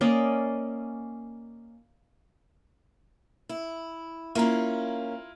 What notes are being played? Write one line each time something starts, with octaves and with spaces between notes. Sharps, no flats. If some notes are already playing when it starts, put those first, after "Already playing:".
A#3 C#4 D5 D#5
E4
A#3 C#4 E4 F4 A#5